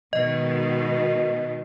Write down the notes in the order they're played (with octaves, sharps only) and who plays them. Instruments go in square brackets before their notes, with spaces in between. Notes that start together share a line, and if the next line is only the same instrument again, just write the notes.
[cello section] B2 D#3 G#3 [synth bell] D#5